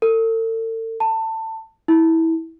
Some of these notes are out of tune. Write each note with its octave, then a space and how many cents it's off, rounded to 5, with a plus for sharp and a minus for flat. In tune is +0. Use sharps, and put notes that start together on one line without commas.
A4 +40
A5 +20
E4 -20